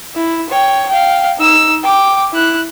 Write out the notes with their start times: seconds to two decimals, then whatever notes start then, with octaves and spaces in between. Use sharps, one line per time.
0.15 E4
0.50 C#5 G5
0.89 F5 G5
1.38 D#4 E6
1.83 G5 D6
2.33 E4 F#6